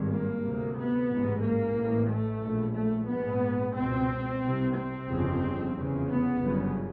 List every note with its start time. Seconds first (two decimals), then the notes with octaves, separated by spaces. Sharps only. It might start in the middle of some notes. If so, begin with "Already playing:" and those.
Already playing: G#1 G2
0.08 A#3
0.43 D2 C3
0.75 B3
1.08 A1 G#2
1.41 A#3
1.75 A1 A2
2.09 A3
2.41 A#1 A2
2.74 A3
3.07 A#1 G#2 B3
3.74 C#2 B2 C4
4.41 C2 C3
4.74 C4
5.07 G1 F2 C#3
5.74 F1 E2 C#3
6.07 B3
6.39 G1 F#2 C#3